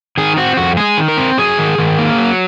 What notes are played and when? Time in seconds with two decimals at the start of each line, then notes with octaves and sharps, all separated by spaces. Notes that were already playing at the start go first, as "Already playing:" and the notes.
0.18 D#3 G#4
0.37 C4 F#4
0.57 F2 F#4
0.77 G#3 G#4
0.98 D#3
1.08 A#4
1.17 C4
1.38 F#3 G#4
1.58 D#3
1.78 D#3
1.99 A#3
2.18 F#3